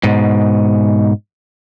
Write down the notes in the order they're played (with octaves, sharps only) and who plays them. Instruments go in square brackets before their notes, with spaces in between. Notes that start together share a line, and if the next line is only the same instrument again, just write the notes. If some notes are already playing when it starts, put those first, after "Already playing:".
[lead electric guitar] G#2 B2